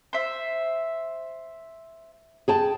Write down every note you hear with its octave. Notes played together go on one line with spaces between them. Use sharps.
C5 E5
G#4 G5 A5